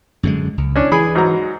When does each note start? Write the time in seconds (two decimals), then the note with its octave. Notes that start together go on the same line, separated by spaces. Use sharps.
0.23 F#2 D3 G#3
0.58 C#2
0.76 C#4 D4
0.92 E3 G#4 B5
1.15 G#2 F#3 A#5